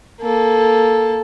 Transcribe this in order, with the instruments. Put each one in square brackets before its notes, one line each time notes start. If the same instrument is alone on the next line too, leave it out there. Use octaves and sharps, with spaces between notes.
[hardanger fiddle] A#3 A4